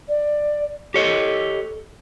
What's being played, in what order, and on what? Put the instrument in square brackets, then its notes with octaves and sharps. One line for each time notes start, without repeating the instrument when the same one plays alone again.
[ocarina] D5
[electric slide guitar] G4 C#5 D#5 [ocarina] A4